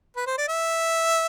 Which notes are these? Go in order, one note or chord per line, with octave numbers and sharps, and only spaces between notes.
B4
C5
D5
E5